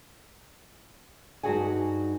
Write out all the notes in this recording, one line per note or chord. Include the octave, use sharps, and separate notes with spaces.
G2 D#4 F#4 G#4 F#5 G#5